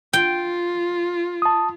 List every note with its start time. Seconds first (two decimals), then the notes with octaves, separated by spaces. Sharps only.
0.13 F4 G5
1.42 A5 D#6